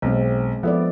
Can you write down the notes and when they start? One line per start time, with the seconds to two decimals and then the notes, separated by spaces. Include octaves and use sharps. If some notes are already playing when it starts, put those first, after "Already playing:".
0.02 B1 G#3 C4
0.63 F3 B3 E4 A4 D5